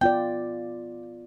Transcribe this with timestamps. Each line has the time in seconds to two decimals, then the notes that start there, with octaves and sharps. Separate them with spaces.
0.01 B3 F4 D5 G5